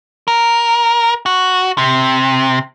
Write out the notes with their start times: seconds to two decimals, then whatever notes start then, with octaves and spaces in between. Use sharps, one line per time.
0.28 A#4
1.26 F#4
1.78 C3